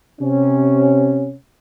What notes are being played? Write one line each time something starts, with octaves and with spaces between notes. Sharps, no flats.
C3 C#4